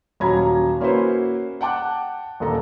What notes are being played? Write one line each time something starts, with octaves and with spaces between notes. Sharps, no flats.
D#1 F#3 C#4 A#5 B5 G#6
A#3 C#4 E4 F#4 B4 C5
F#5 G5 A5 D6 F#6
D#1 A#3 A4 A#5